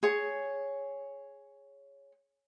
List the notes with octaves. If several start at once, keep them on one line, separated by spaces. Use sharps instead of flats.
G#4 C#5